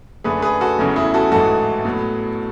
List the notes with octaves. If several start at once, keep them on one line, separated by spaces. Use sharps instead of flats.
F#2 D3 A3 G#4 B4
G#4 B4
F#4 A4
E2 C#3 F#3 A3
E4 G#4
F#4 A4
A1 G#2 E3 A3 F#4 A4
A2 F#3 B3